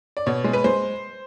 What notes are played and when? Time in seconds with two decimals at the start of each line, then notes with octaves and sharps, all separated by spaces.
0.17 D5
0.26 B2 C#5
0.44 G#3
0.53 B4
0.64 G#3 C5